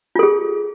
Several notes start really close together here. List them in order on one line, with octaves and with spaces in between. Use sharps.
F4 A4 G#4